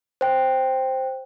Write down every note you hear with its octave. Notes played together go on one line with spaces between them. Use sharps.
C5 G5